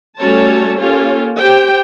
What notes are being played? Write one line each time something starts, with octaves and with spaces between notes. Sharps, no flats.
G3 A3 C#4 F#4 C#5 A5
A#3 C#4 F4 G4 A4 C#5
G4 C5 G5